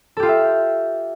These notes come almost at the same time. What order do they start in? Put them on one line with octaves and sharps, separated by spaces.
A4 G4 F4 G5 E5